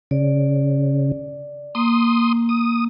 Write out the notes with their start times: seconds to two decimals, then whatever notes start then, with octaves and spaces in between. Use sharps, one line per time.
0.11 C#3 D5
1.75 A#3 C6 D#6
2.49 D#6